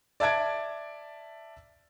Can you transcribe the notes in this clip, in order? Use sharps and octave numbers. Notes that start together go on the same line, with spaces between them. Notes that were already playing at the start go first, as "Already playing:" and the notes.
D5 E5 A5 G#6 D7